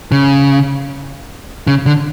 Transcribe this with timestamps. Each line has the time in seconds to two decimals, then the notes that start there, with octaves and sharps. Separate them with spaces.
0.12 C#3
1.67 C#3
1.86 D3